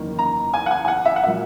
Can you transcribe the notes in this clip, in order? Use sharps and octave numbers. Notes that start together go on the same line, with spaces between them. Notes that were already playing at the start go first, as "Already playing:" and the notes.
Already playing: F#1 E2 D#3 A#3
A#5
G#5
F#5
G#5
G#5
F#5
E5
F#5
A#2 F#3 E5